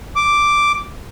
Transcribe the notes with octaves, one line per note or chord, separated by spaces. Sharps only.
D6